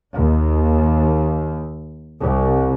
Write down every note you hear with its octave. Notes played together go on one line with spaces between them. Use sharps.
D#2
C2